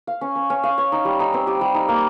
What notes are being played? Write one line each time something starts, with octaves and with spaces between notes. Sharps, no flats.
F5
C#4
C#4
C#4
F5
C#5
D#4
G3
D#4
C4
G4
G3
D#4
A#3